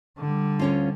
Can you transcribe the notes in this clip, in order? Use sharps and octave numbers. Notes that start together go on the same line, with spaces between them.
D3 G3
D2 C#4 F4